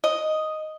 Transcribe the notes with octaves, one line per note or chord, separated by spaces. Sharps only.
D#5